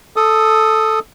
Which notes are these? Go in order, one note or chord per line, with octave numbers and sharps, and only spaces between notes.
A4 D#6